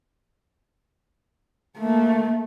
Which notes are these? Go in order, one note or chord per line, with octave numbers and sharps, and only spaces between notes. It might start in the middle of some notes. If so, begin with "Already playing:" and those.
A3 A#3